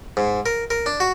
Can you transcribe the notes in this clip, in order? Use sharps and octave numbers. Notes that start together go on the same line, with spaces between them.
G#2
A#4
A#4
D4
F#4